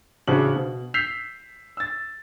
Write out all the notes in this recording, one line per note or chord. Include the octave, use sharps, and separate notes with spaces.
A1 C#3 C4 D4 F#4 F#7
B2
E6 G6 B6 C7 F7
E6 A6